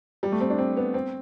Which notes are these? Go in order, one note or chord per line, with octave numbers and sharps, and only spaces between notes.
G3
A3
C4
D4
C4
B3
C4